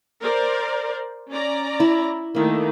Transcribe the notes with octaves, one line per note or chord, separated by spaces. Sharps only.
A#4 C5 D5
C#4 D5 A#5
E4
D#3 A3 A#3 E4